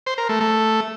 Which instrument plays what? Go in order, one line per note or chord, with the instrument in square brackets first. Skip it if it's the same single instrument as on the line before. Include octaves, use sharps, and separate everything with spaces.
[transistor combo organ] C5
A#4
A3
A3